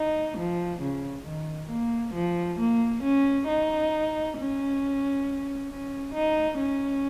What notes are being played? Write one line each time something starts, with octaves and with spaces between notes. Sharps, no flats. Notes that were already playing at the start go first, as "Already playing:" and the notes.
Already playing: D#4
F3
C#3
D#3
A#3
F3
A#3
C#4
D#4
C#4
C#4
D#4
C#4